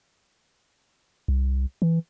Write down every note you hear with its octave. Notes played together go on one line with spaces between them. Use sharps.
C2
E3